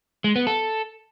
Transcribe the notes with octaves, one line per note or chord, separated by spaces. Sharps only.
G#3
B3
A4